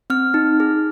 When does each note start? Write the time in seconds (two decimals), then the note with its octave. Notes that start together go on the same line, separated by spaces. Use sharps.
0.10 C4 F6
0.34 D#4
0.60 G#4